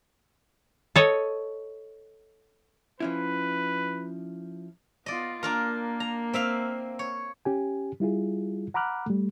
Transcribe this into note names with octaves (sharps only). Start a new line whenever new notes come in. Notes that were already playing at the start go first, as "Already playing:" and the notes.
A4 C#5 D#5
F3 C#4 E4 B4
B3 F4 D5 D#5
A#3 D4 F4 A#4
A#5
C4 E5 F5
C#5
C#4 G4 G#5
G3 E4 F4 G#4
F#5 A#5 B5 D6 F6 F#6
G3 A3